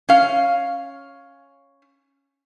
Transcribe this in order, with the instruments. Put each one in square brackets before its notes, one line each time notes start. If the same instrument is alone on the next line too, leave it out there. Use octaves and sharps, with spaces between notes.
[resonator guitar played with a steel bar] C#4 F5